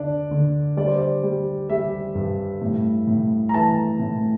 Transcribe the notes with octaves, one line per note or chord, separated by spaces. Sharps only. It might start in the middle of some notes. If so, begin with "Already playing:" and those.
Already playing: D3 D4 D5
D3
G3 D5
C5
D5
G3
G3 E5
G2
A2
A2
A#5
E3 A5
A2